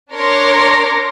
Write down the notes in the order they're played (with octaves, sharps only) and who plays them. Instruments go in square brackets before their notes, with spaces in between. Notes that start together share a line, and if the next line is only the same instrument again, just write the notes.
[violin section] D4 A#4 C#5 C6 D6 A#6